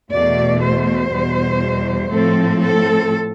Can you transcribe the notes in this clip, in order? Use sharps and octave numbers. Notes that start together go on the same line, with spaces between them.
E2 B2 A3 D5
C5
E2 B2 G3
A2 F3 C4 A4
A4